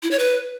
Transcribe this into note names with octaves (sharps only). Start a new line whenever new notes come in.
E4
C#5
B4